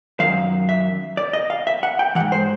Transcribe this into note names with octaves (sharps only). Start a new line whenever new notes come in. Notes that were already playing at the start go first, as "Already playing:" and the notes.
F#2 D#3 F#3 F5
E5
D5
D#5
F5
E5
F#5
G5
E3 F#5
G#2
C5